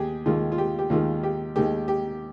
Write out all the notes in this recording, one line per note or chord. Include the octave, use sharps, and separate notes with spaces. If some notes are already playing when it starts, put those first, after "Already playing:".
Already playing: D#2 G4 G#4
D#2 D#3 G#3 F4
F4
G4
G4
D#2 D#3 G#3 F4
G4
D#2 D#3 G#3 G4
G4